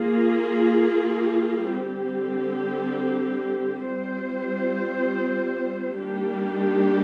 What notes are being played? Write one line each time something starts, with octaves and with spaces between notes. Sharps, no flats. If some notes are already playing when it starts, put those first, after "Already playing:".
Already playing: A#3 F4 G#4
D3 G3 C4 G4
G3 C4 F4 C5
D#3 G3 A#3 D4 G4